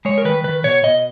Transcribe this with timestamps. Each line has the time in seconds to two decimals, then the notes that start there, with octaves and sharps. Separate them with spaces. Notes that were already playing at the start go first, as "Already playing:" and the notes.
0.05 G#3 C#5
0.18 A#4
0.25 D#3 B4
0.44 D#3 B4
0.64 B2 C#5
0.84 B2 D#5